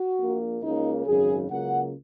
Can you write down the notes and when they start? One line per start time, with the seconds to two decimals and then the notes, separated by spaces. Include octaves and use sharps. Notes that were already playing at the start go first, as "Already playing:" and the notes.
Already playing: F#4
0.19 A#1 A#2 A#3
0.63 C#2 C#3 A#3 D#4
1.06 G#1 F#2 C#3 G#4
1.50 C#2 C#3 F#3 A#3 F#5